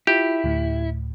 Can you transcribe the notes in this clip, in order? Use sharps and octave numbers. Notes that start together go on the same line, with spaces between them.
E4 F4 G4
D2 A2